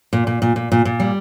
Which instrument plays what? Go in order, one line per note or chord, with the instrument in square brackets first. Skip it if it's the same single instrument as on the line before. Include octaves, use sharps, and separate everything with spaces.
[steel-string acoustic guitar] A#2
A#2
A#2
A#2
A#2
A#2
G3